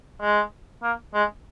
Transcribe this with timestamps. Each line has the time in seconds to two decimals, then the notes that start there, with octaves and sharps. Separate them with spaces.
0.22 G#3
0.83 A#3
1.14 G#3